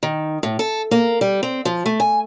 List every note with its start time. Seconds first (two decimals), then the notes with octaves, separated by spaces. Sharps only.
0.03 D#3
0.43 A2
0.59 A4
0.91 A#3
1.21 G3
1.43 C4
1.65 F3
1.86 A3
2.00 G#5